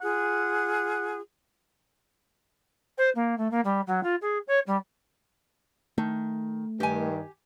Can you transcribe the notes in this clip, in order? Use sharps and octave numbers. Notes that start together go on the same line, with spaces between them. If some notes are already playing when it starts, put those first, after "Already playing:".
F4 G#4 F#5
C5
A#3
A3
A#3
G3
F#3
F4
G#4
C#5
G3
D#3 A3
G2 D#3 G4 G#5